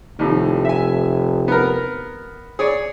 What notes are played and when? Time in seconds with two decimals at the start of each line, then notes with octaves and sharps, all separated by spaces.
0.19 F1 D#2 A2
0.65 E5 G#5
1.48 B3 A#4
2.59 G#4 C#5 D5